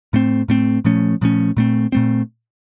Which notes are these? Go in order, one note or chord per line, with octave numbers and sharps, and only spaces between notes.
A2 A3 C4
A2 A3 C4
A#2 F3 A3 C#4
A#2 F3 A3 C#4
A#2 A3 C4
A#2 A3 C4